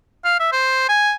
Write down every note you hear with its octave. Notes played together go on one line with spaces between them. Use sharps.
F5
E5
C5
G#5